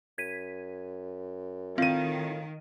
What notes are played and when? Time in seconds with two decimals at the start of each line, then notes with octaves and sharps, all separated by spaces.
0.18 F#2 G#6 B6 D#7
1.78 A2 D#3 C4 F4 D#7